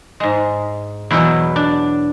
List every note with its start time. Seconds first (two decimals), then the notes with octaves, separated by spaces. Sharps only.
0.20 G#2 G#3
1.11 E2 B2 F#3 E4
1.56 D4